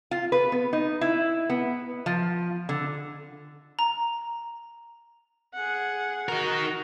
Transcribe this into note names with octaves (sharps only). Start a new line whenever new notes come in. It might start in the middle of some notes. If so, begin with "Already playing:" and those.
F4
B4
B3
D#4
E4
B3
F3
D3
A#5
G#4 F#5
D#4 F#4 A#4